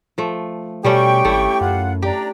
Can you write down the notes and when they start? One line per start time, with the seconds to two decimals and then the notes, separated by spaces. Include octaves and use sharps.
0.18 F3 A3
0.84 B2 G3 A3 C#4 G4 G5 C#6
1.25 G#1 A3 E4
1.61 F#2 F4 F#5
2.02 D4 G4 A#5